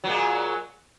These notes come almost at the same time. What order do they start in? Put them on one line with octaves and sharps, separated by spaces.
F#3 A#2 G#3